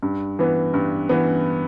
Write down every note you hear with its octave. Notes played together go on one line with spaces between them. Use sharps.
G2
E3 B3
G2
E3 B3